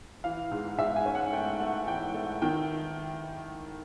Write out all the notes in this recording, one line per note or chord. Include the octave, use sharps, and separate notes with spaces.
E3 F5
G#2
G#2 E5
G#5
C#4
F#5
A3 G5
A3
E3 G5
A3
D#3 G5